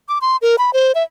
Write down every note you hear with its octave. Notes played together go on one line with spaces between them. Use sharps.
D6
C6
A#4
B5
C5
E5